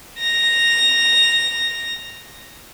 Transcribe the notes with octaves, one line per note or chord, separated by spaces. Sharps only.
A#6 F7